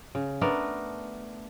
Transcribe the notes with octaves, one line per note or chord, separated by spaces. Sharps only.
C#3
A3 B3 D4 A#4